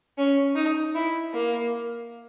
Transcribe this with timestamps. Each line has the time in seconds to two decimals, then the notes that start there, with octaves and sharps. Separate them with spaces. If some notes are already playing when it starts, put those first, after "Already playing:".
0.18 C#4
0.56 D#4
0.95 E4
1.34 A#3